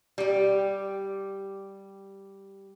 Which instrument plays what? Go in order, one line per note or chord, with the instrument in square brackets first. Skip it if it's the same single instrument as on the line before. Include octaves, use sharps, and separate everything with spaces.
[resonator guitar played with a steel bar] G3 G4